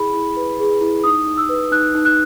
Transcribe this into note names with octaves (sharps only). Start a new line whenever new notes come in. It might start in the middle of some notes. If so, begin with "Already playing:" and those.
Already playing: E4 G#4 B5
E4
B4
G#4
E4
D#4 D#6
D#4
E6
B4
D#4 F#6
D#4
F#6